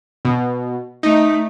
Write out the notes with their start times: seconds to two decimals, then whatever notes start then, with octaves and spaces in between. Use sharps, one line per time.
0.25 B2
1.03 A3 D#4